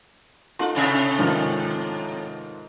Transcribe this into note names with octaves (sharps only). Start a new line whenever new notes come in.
D#4 F4 A4 C6
A2 C3 E5
G#2 D#3 F3